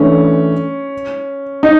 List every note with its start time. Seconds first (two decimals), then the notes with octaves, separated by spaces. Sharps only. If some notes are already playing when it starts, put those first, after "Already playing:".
Already playing: E3 A3 C#4 D4
1.63 D#4